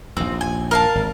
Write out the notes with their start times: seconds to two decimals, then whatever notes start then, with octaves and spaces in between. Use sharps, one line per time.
0.17 A#1 D#2 C4
0.41 G#5
0.71 A#4 F5 A5
0.95 G#1